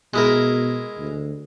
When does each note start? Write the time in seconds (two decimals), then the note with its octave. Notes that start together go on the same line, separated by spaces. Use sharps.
0.14 B2 G#3 E4 A#4
0.98 D2